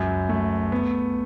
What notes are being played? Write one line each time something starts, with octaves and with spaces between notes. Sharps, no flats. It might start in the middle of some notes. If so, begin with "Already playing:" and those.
Already playing: C#2 F#2
A3
B3